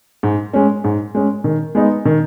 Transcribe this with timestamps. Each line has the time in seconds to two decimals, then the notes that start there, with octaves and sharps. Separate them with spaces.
0.23 G#2
0.53 G#3 C#4
0.84 G#2
1.15 G#3 C#4
1.44 D#3
1.75 G#3 B3 D#4
2.05 D#3